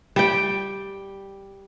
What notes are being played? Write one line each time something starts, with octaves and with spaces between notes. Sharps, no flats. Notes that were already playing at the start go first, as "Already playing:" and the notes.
G3 G5